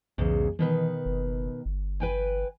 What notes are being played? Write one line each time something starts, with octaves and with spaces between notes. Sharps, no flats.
B1 E2 G#2 C#3
B2 D#3 E3 B4
F#1
G1
B4 G5 G#5